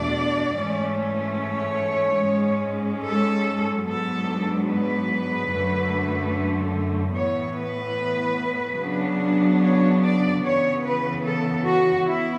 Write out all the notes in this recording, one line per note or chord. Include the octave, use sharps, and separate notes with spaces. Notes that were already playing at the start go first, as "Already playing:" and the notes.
Already playing: E2 B2 A3 D4 D5
G#2 E3 A3 C#4
C#5
G#2 G#3 C#4
A4
G#2 F#3 B3 D4 A4
B4
F#2 D3 A3
A2 E3 B3 C#5
B4
C#3 F#3 B3 D4
C#5
D5
C#3 E3 B3 C#5
B4
A4
F#4
E3 B3 E4